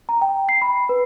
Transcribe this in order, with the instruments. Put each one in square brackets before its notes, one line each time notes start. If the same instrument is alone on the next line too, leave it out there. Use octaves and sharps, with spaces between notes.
[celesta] A#5
G5
C7
B5
B4